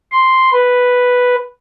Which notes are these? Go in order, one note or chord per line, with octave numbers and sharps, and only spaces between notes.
C6
B4